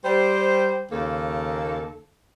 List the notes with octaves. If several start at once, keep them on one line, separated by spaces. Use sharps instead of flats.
G3 C5
D#2 C#3 A#3 A4